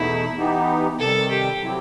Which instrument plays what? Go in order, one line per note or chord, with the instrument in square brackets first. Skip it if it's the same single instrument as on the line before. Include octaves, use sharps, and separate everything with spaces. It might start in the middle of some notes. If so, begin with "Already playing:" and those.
Already playing: [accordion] E2 B2 A3 D#4 [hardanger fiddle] E4
[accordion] E3 B3 D#4 G4
[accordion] C3 D#3 G3 [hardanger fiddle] A4
[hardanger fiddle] G4
[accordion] C3 F#3 C4 E4 G4